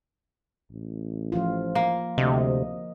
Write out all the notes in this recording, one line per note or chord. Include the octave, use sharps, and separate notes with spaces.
A1
F3 F4
A#3
D2 C3 D#5